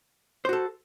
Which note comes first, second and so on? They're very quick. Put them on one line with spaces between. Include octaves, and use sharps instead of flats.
C5 F#4 A4